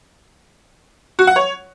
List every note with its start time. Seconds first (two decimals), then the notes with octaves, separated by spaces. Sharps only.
1.19 F#4
1.27 F#5
1.36 C#5